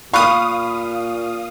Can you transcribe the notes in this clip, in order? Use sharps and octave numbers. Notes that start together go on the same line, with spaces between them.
A#2 F5 B5 C#6 D#6 F#6